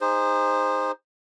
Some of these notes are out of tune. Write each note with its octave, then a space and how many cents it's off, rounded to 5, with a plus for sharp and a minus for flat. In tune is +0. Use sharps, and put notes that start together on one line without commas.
D#4 +0 G#4 -35 C5 +0